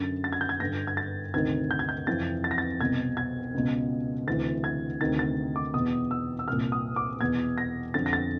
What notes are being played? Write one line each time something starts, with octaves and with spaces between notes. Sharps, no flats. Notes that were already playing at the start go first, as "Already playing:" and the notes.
Already playing: F#2 D3 A6
A6
G#6
G6
G#6
G2 D3 A#6
G#6
A6
D2 C3 D#3 G#6
G6
G#6
G6
F2 C3 E3 A6
A6
A#6
A6
C2 B2 G#6
G#6
C#2 B2
D2 C3 E3 A6
G#6
D2 C3 D#3 A6
A6
D6
E2 B2 D#6
E6
E6
C2 A#2 F6
D#6
D6
E2 B2 G#6
A#6
F2 D3 A6
A#6
A6